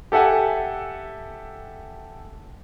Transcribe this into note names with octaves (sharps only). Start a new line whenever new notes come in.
G4 A4 E5 F#5 G#5